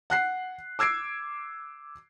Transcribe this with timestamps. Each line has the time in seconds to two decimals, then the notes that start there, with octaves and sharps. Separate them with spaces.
0.10 F#5 F#6 C7
0.79 D6 E6 G#6 C7 D7